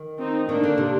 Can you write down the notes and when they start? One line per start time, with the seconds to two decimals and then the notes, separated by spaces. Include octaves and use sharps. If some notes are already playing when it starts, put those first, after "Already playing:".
Already playing: D#3
0.19 C4 D#4
0.48 D#3 A#3 D4
0.63 D3
0.78 C3